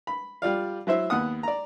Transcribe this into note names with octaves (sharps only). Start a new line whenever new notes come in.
B5
G3 F4 D5 F5
F#3 E4 C5 E5
D#2 B3 F#5 D#6
D5 A#5